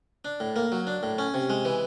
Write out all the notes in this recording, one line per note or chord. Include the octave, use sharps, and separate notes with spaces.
D4
A2
A#3
F#3
D4
A2
C#4
C3
G#3
E3